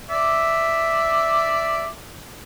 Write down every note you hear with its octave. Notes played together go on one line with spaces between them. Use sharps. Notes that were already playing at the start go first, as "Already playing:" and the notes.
D5 E5